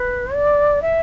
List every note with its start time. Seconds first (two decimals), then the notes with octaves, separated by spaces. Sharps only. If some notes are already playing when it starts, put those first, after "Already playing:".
Already playing: B4
0.34 D5
0.82 E5